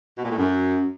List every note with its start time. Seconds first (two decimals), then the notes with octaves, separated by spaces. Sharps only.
0.18 B2
0.25 A#2
0.31 A2
0.38 F#2